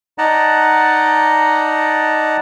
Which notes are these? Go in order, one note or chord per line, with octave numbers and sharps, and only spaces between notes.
D#4 D5 D#5 F#5 A5 A#5